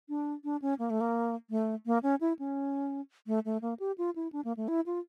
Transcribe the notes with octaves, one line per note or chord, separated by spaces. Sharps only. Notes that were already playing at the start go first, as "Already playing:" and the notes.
D4
D4
C#4
A#3
A3
A#3
A3
A#3
C#4
E4
C#4
A3
A3
A#3
G4
F4
E4
D4
A#3
A3
E4
F4